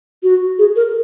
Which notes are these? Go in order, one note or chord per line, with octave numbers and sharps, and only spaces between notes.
F#4
G#4
A#4